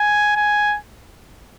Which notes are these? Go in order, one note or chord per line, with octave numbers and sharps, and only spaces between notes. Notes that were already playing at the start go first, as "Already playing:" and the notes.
Already playing: G#5
G#5